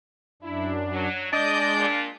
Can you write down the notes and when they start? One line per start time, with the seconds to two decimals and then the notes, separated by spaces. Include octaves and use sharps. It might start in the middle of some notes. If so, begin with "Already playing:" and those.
0.42 F#2 D4 E4
0.92 F#3
1.33 G#3 D4 D5 D#5 G6
1.77 A#2